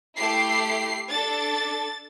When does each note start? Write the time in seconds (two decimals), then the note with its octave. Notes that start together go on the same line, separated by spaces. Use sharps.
0.17 A3 E4 G4 C7
1.09 D4 A4 A6